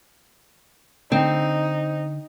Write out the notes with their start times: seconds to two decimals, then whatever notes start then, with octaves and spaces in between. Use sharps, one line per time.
1.12 D3 C4 D#4